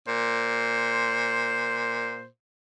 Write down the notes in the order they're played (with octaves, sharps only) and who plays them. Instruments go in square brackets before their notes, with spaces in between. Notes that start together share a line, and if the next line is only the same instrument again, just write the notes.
[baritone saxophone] A#2 [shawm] C5